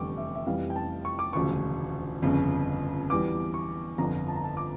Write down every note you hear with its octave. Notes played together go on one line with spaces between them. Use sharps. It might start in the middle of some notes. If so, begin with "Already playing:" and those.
Already playing: F1 E2 D3 G3 G5 C#6 D6
E5
E5
F1 F2 E3 G3 F5
G5
A5
C#6
D6
E1 D2 C#3 F3 C#6
G1 F2 C#3
E2 E3 G3 D6
C#6
G1 F2 D3 F3 A#5
A5
A#5
A5
D6